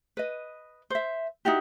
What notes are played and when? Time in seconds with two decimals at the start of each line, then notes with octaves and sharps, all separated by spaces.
0.17 B4 D#5
0.90 C5 E5
1.45 D#4 E4 F#4 G4